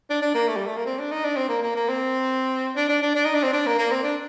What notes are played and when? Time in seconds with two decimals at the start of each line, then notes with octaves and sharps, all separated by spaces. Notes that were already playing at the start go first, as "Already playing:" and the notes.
0.10 D4
0.22 D4
0.34 A#3
0.48 A3
0.57 G3
0.67 A3
0.77 A#3
0.86 C4
0.99 D4
1.12 D#4
1.24 D4
1.37 C4
1.49 A#3
1.62 A#3
1.76 A#3
1.88 C4
2.77 D4
2.89 D4
3.03 D4
3.15 D4
3.25 D#4
3.35 D4
3.43 C4
3.53 D4
3.66 A#3
3.78 A#3
3.92 C4
4.04 D4